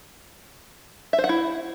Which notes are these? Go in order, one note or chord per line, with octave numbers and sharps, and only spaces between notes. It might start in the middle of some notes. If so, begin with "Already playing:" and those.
E5
C5
F#5
E4